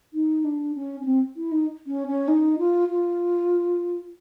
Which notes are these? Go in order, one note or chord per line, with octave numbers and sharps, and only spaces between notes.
D#4
D4
C#4
C#4
C4
E4
D#4
C#4
C#4
D#4
F4
F4